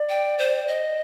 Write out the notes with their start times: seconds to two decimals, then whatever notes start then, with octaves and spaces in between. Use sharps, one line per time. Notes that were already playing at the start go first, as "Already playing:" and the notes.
Already playing: D5
0.09 G5
0.39 C5
0.68 D#5